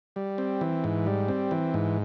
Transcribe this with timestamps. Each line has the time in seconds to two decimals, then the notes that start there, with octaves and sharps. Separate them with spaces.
0.16 G3
0.38 C4
0.61 E3
0.84 G#2
1.06 G3
1.28 C4
1.51 E3
1.74 G#2